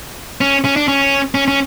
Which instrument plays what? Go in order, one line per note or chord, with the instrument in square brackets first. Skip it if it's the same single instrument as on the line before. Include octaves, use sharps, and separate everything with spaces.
[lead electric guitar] C#4
C#4
D4
C#4
C#4
C#4